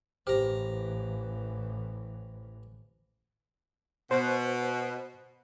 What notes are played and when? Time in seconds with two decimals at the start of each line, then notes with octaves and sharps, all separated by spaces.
0.27 A1 E3 G4 C5 A#5
4.11 B2 C5